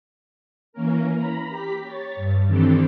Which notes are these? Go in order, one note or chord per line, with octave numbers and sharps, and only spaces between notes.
E3 A#3 C#4 A#4
A#5 B5
G4 B6
C#5 A6
G2
D#3 E3 C4 D4 G4 A4